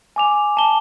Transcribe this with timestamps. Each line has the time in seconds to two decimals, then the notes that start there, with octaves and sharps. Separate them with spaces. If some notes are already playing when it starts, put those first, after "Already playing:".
0.16 G#5 D6 F7
0.57 A5 G7